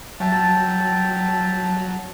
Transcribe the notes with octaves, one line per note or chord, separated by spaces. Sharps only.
F#3 E5 G5 A5